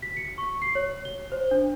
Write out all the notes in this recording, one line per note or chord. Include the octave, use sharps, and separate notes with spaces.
B6
C#7
C#6
C7
C#5
G7
C5
D4